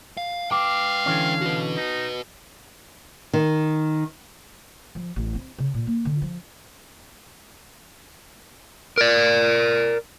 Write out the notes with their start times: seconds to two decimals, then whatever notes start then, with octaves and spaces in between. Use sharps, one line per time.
0.17 F5
0.51 B4 F5 G5 D6
1.06 D3 E3 C#4
1.42 F#4 B4
1.76 D#4
3.33 D#3
4.95 F3
5.16 A1
5.35 C4
5.59 C#3
5.74 A#2
5.87 A#3
6.05 D3
6.22 F3
8.98 A#4 D5